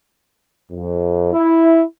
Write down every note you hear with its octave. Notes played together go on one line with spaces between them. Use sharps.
F2
E4